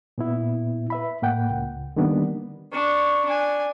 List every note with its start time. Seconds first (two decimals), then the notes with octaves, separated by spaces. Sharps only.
0.18 A#2 B3 E4
0.90 B4 E5 B5
1.22 A2 A#3 F#5 G5
1.50 C#2
1.96 D3 D#3 G3 A#3 B3 D4
2.72 D4 C#6
3.25 D4 G#5